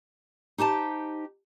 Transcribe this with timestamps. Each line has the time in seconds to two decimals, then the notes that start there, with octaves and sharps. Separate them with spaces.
0.58 D#4 G4 C5 A5